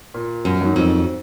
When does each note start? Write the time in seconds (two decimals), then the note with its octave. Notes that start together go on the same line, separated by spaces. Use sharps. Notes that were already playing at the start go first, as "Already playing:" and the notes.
0.14 A#2
0.45 F#2
0.61 F#3 A#3 D#4
0.76 F2